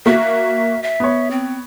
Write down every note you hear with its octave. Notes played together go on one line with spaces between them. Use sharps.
A#3 F#4 E5
E5
B3 C#5
C4